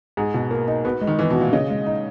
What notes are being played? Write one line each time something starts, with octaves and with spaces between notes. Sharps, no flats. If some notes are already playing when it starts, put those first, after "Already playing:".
G#2 G#4
B2
A#3
D#4
B2 B4
G#3
D#3
E3 B3
B2
F#4
A#2
C#3 D#5
G#3
D#4